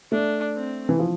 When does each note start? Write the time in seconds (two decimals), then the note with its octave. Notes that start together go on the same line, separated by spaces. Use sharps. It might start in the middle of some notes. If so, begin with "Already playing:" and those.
0.12 A3 D4
0.56 C4
0.89 E3
0.99 F3